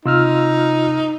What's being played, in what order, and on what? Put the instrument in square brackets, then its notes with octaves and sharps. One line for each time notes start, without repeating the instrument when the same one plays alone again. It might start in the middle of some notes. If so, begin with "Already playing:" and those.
[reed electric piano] C3 [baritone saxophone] D#4 [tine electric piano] F4 E6 F6